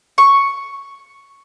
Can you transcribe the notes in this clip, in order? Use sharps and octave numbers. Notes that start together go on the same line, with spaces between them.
C#6